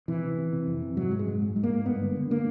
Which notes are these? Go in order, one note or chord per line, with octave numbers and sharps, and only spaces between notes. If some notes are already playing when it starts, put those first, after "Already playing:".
C3 E3
C3
C3
C3
F2
C3
G#2 F#3
G#2
G#3
G#2
G#2
G#2
A#3
G#2
G2 B3
D3
D3
D3 A#3